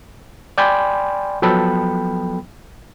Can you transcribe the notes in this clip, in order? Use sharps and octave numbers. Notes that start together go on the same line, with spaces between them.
D5 G5 G#5 B5 C6
F3 F#3 B3 A4 G5 B5